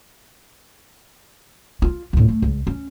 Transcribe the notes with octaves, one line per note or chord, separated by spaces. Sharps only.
F4
D2 A2
A3
C#2
C#4